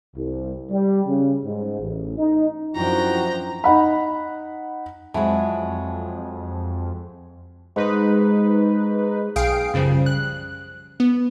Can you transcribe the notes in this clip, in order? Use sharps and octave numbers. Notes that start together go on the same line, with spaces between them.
C2
G3
C#3
G#2
A1
D#4
F#2 F3 D4 E4 F#4 G5 A#5
D#4 F#5 B5
F2 F#3 G#3 E4 F#5 G#5 A5
G#2 D#4 B4
B1 G#4 F5 G5 C7 D7
F#2 C#3 F3 G3
F#6
B3